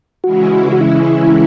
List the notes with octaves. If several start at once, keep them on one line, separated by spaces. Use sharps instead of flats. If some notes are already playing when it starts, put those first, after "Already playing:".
C#3 E3 G#3 C#4 E4 F#4
F#4
E4